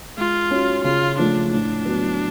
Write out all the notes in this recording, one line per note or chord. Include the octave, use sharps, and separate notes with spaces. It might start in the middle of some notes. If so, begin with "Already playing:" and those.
G#3 F4
C#4 F#4
C#3 F4
F3 A3 D4
A2 D4
F#3 B3 F#4